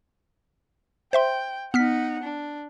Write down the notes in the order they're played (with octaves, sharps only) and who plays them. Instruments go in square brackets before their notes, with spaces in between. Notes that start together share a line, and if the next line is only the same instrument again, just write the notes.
[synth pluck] C5 E5 C6 [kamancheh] G5
[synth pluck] B3 F6 B6 [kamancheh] D#4 F#5
[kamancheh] D4